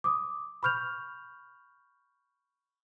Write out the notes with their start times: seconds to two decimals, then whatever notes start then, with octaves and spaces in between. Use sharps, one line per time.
0.04 D6 D#6
0.63 B5 C#6 F6 G6 F7